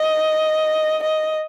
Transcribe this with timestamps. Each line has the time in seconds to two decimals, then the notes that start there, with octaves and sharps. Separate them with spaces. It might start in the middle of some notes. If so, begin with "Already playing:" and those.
Already playing: D#5
1.03 D#5